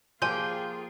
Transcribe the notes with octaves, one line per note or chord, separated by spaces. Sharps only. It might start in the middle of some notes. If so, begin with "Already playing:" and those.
F3 A#3 F4 G4 G#4 G5 G#5 C6